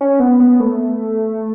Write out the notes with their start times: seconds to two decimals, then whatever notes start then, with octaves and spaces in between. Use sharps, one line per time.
0.01 C#4
0.20 B3
0.40 B3
0.60 A3